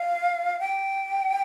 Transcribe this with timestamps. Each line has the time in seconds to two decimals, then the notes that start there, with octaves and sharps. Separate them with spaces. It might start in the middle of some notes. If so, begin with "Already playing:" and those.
Already playing: F5
0.60 G5